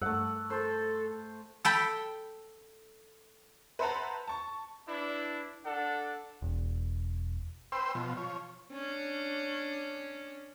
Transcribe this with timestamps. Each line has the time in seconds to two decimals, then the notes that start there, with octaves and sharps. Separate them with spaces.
0.02 G2 A3 F#5 E6
0.50 A4 C5
1.65 A4 G5 B5
3.79 B4 C5 E5 F#5 A5 A#5
4.27 A5 C#6
4.88 D4 E4 B4
5.64 D4 A4 F#5
6.42 E1
7.72 B4 C5 G5 C6 E6
7.95 B2 F3
8.17 F3 C#5
8.73 C#4 D4